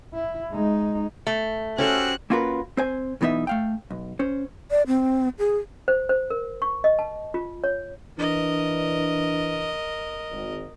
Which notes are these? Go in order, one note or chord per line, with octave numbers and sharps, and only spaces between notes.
E4
G#3 D#4
A3
C#4 F#4 G4 A4 C5 C#5 F#6
A#3 C#4 F4 F#4 A#4 B4
C4 C5 G#5
B1 E3 B3 D#4 E5
A3 F5 G5
B1
C#4 C5
D5
C4
G#4
C5
C5
A#4
C#6
D#5
A5
F4
C#5
E3 D4 A#4 D#5
G#1